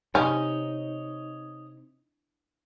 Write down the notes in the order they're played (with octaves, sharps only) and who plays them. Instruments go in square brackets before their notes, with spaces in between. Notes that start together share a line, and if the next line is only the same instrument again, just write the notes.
[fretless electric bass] C3 [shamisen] C#4 [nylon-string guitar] D#4 [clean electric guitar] C#5 D#5